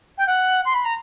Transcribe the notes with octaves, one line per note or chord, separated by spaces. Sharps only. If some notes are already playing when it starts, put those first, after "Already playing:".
G5
F#5
C6
B5
A#5